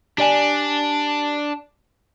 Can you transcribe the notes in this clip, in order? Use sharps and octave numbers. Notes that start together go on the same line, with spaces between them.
D4 G4 D5 G#5